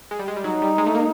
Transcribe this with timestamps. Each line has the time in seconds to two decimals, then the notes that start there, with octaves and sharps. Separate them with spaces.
0.11 G#3
0.19 G3
0.28 G#3
0.36 G3
0.44 F#3 D#4
0.62 G3
0.78 G#3
0.86 A3
0.94 A#3